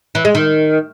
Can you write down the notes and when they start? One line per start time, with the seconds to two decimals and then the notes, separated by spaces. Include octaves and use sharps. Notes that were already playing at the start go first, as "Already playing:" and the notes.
0.15 E3
0.25 G#3
0.35 D#3